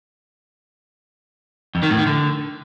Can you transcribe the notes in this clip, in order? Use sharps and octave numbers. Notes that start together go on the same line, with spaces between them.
F2
D#3
A2
D#3
D3